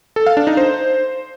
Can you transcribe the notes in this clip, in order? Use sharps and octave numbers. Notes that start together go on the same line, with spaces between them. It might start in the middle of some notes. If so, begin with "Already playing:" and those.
A4
F5
D4
D#4
C5